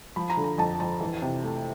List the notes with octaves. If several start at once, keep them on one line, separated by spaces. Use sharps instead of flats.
F3 B5
A#5
D3
A#5
F2 A5
F2 A5
E3
C3
A3